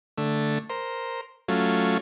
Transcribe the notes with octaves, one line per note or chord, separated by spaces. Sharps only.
D3 A3
A#4 C5
F#3 A3 C#4 F4